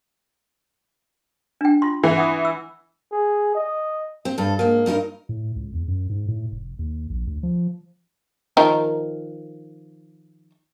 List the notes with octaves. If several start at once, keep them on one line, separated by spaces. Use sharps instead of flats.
D4 G5
F4 C6
E3
F#5 D#6
E6
G#4
D#5
C4
G2 A4
G#2 A#3
G2 D#4 G4 A#4
A2
C#2
E2
F#2
G#2
A2
F1
D#2
A#1
D2
F3
D#3 F3 A#4